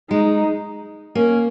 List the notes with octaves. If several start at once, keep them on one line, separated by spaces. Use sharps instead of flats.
G#3 D#4
A#3 C#4